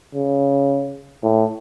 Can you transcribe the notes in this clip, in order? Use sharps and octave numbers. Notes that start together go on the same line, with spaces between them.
C#3
A2